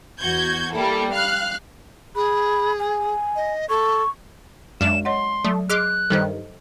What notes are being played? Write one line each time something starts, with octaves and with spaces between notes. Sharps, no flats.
E2 F#4 G6 G#6
G3 A#3 E4 A4
F5 F6 F#6
G#4 B5
G#5
D#5
A4 C#6
F#2 G#3 D4 E5 E7
C#5 D#5 F#5 C6
F#3 A3
G#4 D#5 C6 D6 F6 F#6
G2 D#3 G3 A4 C5 D#5